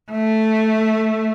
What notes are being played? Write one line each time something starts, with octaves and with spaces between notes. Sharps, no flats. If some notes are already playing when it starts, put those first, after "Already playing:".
A3